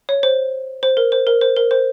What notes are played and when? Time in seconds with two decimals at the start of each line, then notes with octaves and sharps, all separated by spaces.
0.09 C#5
0.23 C5
0.83 C5
0.97 A#4
1.12 C5
1.27 A#4
1.41 C5
1.56 A#4
1.71 C5